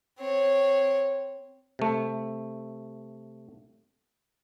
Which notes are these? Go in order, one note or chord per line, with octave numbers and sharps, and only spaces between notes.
C4 C#5
C3 A3